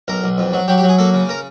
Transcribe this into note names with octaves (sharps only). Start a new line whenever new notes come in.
B1 A#4
B1
F2
F#3
F#3 G4
G4
F#3
G#4
A#3 A4
C#3
A#4